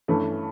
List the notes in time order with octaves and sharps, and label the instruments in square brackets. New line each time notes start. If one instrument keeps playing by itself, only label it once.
[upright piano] G2 E3 A3 C#4